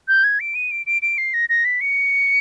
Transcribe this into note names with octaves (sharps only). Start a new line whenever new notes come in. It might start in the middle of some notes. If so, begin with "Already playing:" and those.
G6
G#6
D7
D#7
D7
D7
D7
C7
A#6
A#6
B6
C#7